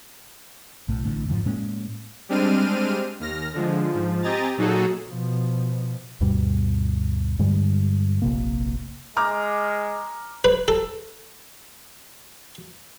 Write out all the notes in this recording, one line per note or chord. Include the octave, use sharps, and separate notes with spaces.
B1 A2
A1 A2 D3
F2 G#2 C#3 F3
A2 G#3 A#3 C#4
G3 G#3 C4 D4 F6 D#7
D#2 F6 A#6
D3 F3 G#3
G#2 F3
C4 G4 D#5 G#5 A#5 A6
A#2 F#3 D#4 F#4 G#4 A4
B2 F3
D2 G2 B2 G3
G2 D3 G3 G#3
F1 A#1 C3 A#3
G#3 A#5 D6 F6
B4
A4